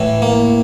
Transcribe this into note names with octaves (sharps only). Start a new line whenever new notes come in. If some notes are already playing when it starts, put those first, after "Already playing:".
Already playing: A2 E3
A#3